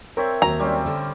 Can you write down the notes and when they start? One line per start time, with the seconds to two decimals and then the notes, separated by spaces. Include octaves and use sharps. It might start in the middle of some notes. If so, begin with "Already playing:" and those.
0.17 C4 A#4 C#5 E5
0.42 D#2 F#3 A#5
0.60 G3 C4 C#4
0.86 D3